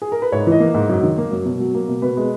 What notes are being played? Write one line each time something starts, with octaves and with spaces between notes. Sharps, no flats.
G#4
A#4
B4
G#2 C#5
E3 D#5
A#3
G#2
F#2
D#3
A#3
F#2
B2
F#3
A#3
B2
B2 B4
G#3